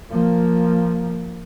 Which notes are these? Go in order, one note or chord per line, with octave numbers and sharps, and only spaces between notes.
F3 A#3